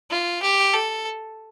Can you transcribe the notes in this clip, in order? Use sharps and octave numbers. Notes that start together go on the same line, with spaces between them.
F4
G4
A4